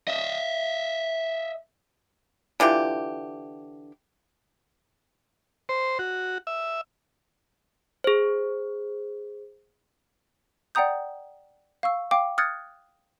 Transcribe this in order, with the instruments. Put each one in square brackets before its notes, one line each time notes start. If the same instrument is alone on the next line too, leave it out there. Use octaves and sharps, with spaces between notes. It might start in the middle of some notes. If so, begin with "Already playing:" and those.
[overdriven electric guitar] D#5 E5
[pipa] D3 E3 F4 G4
[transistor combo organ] C5
F#4
E5
[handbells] G#4 C5
[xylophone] D5 F#5 G5 A#5 D#6 G6
F5 C#6 E6
F5 G5 D6
D#6 F6 F#6 G#6 A6 C#7